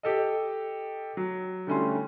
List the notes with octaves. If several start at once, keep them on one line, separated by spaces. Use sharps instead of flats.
G4 A4 D#5
F#3
D3 G3 A3 C#4 E4 C6